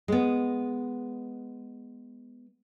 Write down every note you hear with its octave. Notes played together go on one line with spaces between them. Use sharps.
G#3 B3